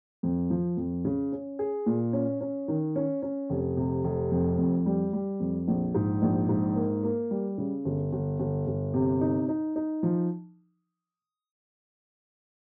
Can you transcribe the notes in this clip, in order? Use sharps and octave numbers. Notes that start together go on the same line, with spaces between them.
F2
F3
F2
C#3
C#4
G#4
A#2
C#4
C#4
D#3
C#4
C#4
F1
C3
F1
F2
F2
G3
G3
F2
A#1
G#2
A#1
G#2
A#3
A#3
G3
C#3
G1
G1
G1
G1
C3
D#4
D#4
D#4
F3